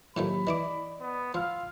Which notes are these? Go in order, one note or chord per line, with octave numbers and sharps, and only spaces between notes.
A2 D#3 F3 F#3 A#3 G4 B5
E3 E4 D5 D#5 D6
B3
F3 F5 C6 E6 F6